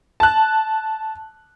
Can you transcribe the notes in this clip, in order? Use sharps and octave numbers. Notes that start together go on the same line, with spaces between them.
A5 F#6